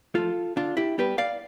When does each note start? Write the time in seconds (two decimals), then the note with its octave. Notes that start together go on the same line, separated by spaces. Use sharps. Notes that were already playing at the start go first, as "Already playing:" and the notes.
0.14 F3 A3 F4 A4
0.56 D3 D4 F4
0.77 E4 G4
0.98 G3 B3 G4 B4
1.18 D5 F5